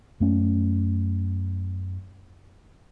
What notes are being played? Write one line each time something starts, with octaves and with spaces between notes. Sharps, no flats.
F#2 A3 C#4